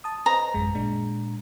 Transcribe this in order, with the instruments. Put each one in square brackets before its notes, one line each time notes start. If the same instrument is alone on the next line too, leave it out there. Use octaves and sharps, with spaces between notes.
[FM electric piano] A5 D#6
[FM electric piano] B4 C5 D#5 [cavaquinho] A#5
[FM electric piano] A1 F#2 G#3
A#2 G#3 D4